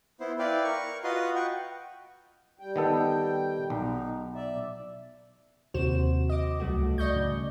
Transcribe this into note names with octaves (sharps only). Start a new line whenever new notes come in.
B3 E4 C5
E4 B4 D5 F5 G5
A#4 C#6
F4 F#4 B4 D#5 F5 C6
F#5 G5 C#6
G3 G5
D#3 B3 A4
B1 D#4
D5 E5
D#2 C3 F#4 C5 E7
D#5 D6
C#2 F#3 A3 F#4
G2
D5 D#5 C#6 G6
G2 C#3